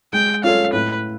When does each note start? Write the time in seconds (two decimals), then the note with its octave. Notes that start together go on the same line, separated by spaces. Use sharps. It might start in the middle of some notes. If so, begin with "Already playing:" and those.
0.13 G#3 G5
0.43 C#4 F4 A4 C#5 F5
0.73 A2 B4